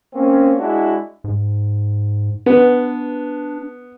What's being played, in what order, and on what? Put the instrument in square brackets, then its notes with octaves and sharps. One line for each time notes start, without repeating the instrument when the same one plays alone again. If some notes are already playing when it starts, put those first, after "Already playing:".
[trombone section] A#3 C4 C#4
G#3 D4 E4 F#4
[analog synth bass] G#2
[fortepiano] B3 [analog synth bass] D4